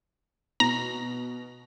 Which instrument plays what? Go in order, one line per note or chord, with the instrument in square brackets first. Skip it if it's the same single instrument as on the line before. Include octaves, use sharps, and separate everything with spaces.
[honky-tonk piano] B2 [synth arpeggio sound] A#5